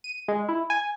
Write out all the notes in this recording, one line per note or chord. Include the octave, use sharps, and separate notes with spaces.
D#7
G#3
E4
G#5